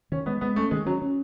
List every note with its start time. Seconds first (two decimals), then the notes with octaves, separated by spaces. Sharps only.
0.12 D#3 C#4
0.26 G#3 B3
0.41 G#3 B3
0.56 A3 C#4
0.71 D#3 G#3
0.86 F#3 C#4
1.02 C#4